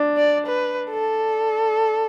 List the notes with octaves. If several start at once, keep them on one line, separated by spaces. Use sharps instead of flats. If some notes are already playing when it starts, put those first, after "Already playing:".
Already playing: D4
D5
B4
A4